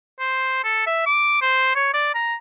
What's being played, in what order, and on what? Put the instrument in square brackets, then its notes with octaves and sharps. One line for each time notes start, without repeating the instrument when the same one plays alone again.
[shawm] C5
A4
E5
D6
C5
C#5
D5
A#5